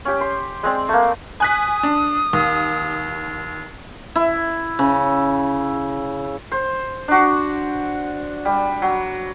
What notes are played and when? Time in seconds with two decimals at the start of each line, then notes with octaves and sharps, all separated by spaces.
0.05 C#4 G4
0.21 C6
0.63 G#3 C4 D5
0.89 A3 A#3
1.40 G#5 D#6 F#6 B6
1.83 D4
2.33 D#2
4.15 E4
4.79 C#3
6.52 C5
7.08 D4 F#4
8.45 G3
8.82 F#3